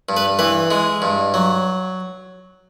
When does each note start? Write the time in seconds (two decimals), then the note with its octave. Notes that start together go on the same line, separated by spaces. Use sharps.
0.09 G2
0.17 B4
0.39 E3 B4
0.71 G#3
1.02 G2
1.34 F#3